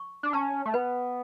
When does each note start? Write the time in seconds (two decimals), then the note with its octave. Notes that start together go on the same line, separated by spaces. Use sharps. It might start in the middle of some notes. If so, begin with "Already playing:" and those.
Already playing: C#6
0.23 D4
0.33 C#4 A5
0.66 A3
0.74 B3 B4